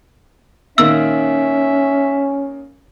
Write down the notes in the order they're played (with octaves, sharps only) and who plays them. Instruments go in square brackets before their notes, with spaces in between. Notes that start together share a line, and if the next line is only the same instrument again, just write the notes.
[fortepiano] A#2 D#3 A#3 [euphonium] C#4 [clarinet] E5 [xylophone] E6